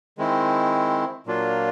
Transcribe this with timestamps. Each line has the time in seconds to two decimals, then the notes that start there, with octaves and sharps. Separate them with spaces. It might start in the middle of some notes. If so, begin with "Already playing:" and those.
0.18 D#3 G#3 C4 E4
1.26 A#2 F#3 A#3 D4 F4